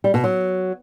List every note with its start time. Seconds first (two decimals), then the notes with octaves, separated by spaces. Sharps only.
0.04 G3
0.14 B2
0.24 F#3